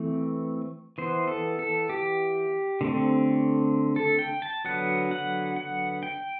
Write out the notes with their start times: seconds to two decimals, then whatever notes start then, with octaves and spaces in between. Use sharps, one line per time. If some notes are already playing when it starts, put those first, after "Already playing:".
Already playing: E3 A3 C4
0.98 E3 B3 C5
1.28 A4
1.59 A4
1.89 G4
2.81 D3 A3 C4
3.96 A4
4.19 G5
4.42 A5
4.65 D3 F#3 B3 F#5
5.11 F#5
5.56 F#5
6.03 G5